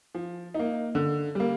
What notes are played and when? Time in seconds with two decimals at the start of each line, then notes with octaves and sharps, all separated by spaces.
0.15 F3
0.54 A#3 D#4
0.95 D3
1.35 G3 A#3